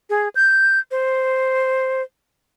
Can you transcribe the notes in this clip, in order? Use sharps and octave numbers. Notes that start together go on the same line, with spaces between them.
G#4
G6
C5